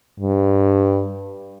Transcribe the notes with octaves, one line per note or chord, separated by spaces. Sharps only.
G2